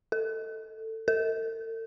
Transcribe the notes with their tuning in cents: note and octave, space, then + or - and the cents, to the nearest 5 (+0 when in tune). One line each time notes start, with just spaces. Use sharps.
A4 +15
A4 +45